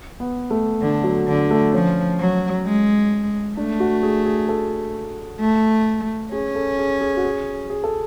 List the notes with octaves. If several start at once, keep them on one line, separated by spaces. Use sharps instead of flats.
B3
A3
D3
F#3
D3
A3
F3 C#4
F#3
G#3
A3 D4
F#4
G#4
G#4
A4
A3
C#4 G#4
A4
G#4
G#4
F#4
G#4
G#4
A4